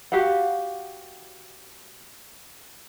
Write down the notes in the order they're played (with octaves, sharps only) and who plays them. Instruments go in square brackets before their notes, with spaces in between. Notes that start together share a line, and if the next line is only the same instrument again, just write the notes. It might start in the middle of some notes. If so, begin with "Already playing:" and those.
[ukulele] F#4 G4 F5 F#5